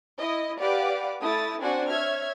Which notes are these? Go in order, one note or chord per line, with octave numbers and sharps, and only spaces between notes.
E4 D#5
G4 B4 D5 F5 F#5 D6
A3 E4 D#6 A6
C4 D4 F#4 C5 F#5 G#5
C#5 E5 F6 G#6